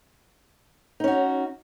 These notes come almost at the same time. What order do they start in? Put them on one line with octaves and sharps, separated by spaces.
D#4 C#4 F#4